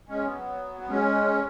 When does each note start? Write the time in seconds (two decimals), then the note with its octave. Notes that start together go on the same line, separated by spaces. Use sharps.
0.09 G#3 C#4
0.25 F#3 B3
0.81 B3
0.89 G#3 C#4